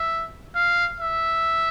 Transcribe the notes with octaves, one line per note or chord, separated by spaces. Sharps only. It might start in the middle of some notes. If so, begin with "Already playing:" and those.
Already playing: E5
F5
E5